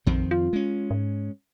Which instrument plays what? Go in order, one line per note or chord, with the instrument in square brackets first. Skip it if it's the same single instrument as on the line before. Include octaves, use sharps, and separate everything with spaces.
[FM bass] A#1 [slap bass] F2 D#3 C4
[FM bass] F4
[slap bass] G#3 C#4
[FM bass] G#2